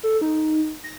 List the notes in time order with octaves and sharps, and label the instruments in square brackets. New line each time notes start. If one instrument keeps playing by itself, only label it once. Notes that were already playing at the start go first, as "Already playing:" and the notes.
[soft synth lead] A4
D#4
A#6